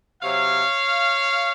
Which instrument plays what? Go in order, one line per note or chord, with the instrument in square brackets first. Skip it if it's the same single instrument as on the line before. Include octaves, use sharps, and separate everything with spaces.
[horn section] C3 F#3 C#5 F5